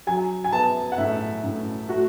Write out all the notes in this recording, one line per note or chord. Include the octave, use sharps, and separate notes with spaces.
F#3 G#5
G#5
B3 A5
F#5
A2 E5
A2
A3 F#4